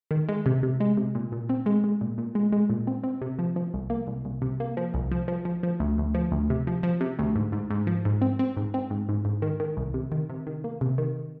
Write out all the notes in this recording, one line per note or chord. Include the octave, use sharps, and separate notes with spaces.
D#3
G#3
C3
C3
G#3
C3
A#2
A#2
C4
G#3
G#3
A#2
A#2
G#3
G#3
A#2
C4
C4
C3
F3
F3
C2
A#3
C2
C2
C3
A#3
F3
C2
F3
F3
F3
F3
D2
D2
F3
D2
C3
F3
F3
C3
D2
G#2
G#2
G#2
F3
G#2
C4
C4
G#2
C4
G#2
G#2
G#2
D#3
D#3
C2
C3
D#3
C3
D#3
A#3
C3
D#3